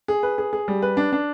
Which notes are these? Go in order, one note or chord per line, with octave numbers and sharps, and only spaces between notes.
G#4
B4
G#4
G#4
G3
B4
D4
D4